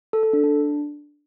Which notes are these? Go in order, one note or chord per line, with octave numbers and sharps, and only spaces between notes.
A4
A4
D4
D4